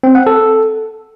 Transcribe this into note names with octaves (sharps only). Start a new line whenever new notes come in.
C4
F#5
A4